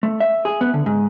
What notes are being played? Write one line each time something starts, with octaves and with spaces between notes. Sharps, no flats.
A3
E5
G#4
B3
D3
G#2